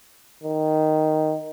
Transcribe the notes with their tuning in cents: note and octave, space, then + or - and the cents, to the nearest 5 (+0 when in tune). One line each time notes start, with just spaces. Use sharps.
D#3 +0